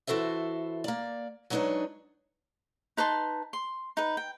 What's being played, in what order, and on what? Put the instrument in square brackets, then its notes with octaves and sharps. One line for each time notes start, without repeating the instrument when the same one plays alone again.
[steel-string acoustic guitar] E3 F#4 A4 C5 E5
A#3 D5
F#3 G#3 D4 D#4 B4 C#5
[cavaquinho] D#4 B4 A5 C6
C6
D#4 B4
G5